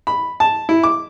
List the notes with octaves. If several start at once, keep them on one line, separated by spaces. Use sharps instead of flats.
B5
A5
E4
D6